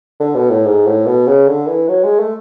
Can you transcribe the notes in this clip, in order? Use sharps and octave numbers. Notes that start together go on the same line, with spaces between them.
D3
B2
A2
G#2
A2
B2
C#3
D3
E3
F#3
G#3
A3